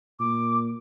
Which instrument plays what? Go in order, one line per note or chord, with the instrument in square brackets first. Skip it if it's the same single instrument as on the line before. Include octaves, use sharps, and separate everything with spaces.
[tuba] A#2 [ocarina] D6